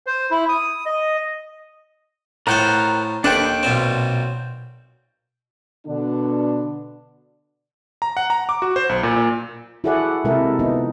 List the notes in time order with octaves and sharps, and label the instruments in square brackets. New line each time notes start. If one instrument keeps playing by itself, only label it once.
[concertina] C5
E4
D#6
D#5
[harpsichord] A2 F4 C5 [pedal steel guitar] A#4 F#5 G5
[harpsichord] D#2 A4 F#5 [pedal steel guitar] D4 B4 G5
[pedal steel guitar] G5
[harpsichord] B1 A#2 C4
[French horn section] B2 D3 D4
[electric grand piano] A#5
F#5
A#5
D6
F#4
C5
B1
A#2
A#2
[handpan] E4 F#4 G#4 A4 D5 F#5
C3 G#3 E4 A4 A#4
F3 B3 D#4